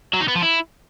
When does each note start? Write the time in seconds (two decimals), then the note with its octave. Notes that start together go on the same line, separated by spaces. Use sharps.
0.14 F#3
0.21 D#4
0.28 B3
0.35 F3
0.43 E4